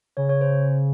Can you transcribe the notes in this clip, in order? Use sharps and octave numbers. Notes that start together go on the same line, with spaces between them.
C#3 C#5
C#5
C5